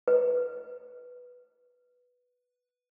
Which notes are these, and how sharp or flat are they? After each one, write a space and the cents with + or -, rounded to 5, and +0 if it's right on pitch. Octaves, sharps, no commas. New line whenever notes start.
B4 +0